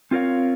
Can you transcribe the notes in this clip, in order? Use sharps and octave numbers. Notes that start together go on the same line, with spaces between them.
C4 F4 A#4 C#5 F5